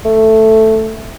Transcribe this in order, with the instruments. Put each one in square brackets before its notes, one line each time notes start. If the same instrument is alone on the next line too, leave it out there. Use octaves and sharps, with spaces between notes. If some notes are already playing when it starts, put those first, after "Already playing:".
[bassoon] A3